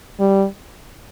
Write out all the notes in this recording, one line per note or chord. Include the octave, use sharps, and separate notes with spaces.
G3